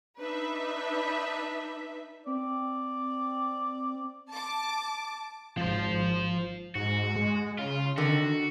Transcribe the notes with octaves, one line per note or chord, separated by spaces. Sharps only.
D4 D#4 B4 E5
C4 D5
A5 D6
G#1 F3 C5
G#2 F#4
G#3
C#3 F4
D3 D#3 F#4